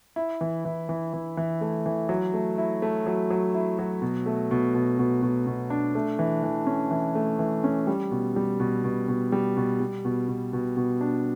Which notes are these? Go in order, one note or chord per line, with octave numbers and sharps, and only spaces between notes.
E4
E3
E3
E3
E3
E3
A3
E3
F#3
A3
E4
A3
F#3
F#3
E4
F#3
B2
A3
B2
B2
B2
B2
B2
D4
A3
E3
E3
C#4
E3
A3
E3
C#4
G3
B2
G3
B2
B2
B2
G3
B2
G3
B2
B2
B2
B2
D4